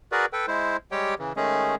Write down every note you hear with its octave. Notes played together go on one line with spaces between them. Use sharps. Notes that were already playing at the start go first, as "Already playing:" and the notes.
F#4 G#4 A#4 B4 D5
A4 B4 G5
G#3 E4 C5
G3 G#3 G4 C#5 G5
C#3 E3
D#3 G#3 A3 C#4 G#4